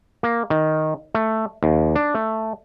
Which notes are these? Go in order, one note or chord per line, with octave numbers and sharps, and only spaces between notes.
A#3
D#3
A3
D#2
D4
A3